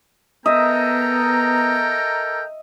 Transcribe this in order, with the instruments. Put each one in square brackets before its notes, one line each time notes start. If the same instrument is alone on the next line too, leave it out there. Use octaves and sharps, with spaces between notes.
[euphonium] B3 [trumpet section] A4 A#4 G5 [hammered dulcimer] D#5 E5 [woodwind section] A#5